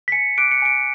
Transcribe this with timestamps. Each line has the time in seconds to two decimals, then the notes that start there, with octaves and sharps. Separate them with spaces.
0.08 B6
0.12 G#5 C#7
0.38 D6 F#6 D7
0.51 C#7
0.62 G#5 D7